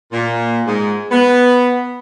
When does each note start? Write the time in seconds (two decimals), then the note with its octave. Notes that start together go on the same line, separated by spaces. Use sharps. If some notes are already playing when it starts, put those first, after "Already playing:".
0.12 A#2
0.67 G#2
1.12 B3